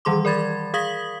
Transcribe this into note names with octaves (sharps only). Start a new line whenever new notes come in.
D#3 E3 G3 G#4 C6 D6
A#4 D5 B5 G#6 A6
G#4 F5 D#6 G#6 B6 F#7